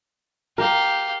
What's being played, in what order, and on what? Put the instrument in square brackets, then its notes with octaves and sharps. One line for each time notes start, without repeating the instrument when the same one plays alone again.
[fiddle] G4 F5 [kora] A#4